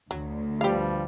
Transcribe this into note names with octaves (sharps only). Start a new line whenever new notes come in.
D2 F#3
G2 F3 G3 G4 F5